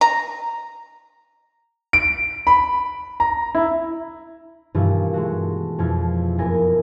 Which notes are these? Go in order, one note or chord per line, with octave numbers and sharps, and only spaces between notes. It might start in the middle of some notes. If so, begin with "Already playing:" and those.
A#5
D7
B5
A#5
E4
G2 B2 D#3 E3 E4 F4
G#3 A3 F#4
F2 B2 E4 F4 G#6
F#1 B3 E4 A#4 G#5 A#6